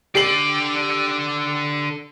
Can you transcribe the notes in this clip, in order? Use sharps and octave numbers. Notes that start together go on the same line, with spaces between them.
D3 G4 D5 C7 F#7